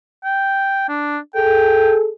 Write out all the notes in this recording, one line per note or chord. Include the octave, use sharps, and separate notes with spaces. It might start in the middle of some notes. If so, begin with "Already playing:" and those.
G5
D4
G#4 A4 G5